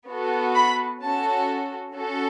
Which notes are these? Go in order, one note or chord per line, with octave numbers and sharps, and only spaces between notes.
B3 F#4 A4
B5
C#4 F#4 A4 A5
C#4 F#4 A4